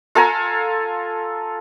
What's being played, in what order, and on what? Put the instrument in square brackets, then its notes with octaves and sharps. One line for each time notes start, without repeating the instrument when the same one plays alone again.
[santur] F4 A4 G#5 A#5